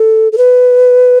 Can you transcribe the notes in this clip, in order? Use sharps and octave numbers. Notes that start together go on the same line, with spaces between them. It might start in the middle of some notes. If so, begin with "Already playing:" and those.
Already playing: A4
A4
B4